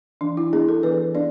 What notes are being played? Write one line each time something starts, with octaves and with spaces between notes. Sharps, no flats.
E3 D4
E4
B3 D4 G#4
A4
E3 B4
B3 D4 D5